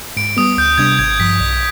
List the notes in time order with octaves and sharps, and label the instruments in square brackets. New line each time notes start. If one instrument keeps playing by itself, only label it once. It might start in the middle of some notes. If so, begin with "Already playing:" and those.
[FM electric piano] G#2 [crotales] D7
[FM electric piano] G3 B3 [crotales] D#6
[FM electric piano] D2 [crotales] G6
[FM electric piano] C3 G3 B3 D4 [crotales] G#6
[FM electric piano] G#1 [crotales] G#6
[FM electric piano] G2 F3 [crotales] B6
[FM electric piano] B1